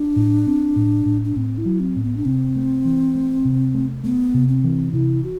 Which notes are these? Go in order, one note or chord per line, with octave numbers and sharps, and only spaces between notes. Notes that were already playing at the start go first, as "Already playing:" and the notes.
Already playing: D4
A2
C4
A2
A2
D4
A2 C4
E4
F#3
C4
A2
B3
D4
C3 C4
A3
E3
A3
C3
A3
A3 B3
C3
C4
E3
C3 E4
F#4